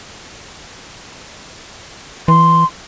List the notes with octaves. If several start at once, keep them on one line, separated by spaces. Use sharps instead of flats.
E3 C6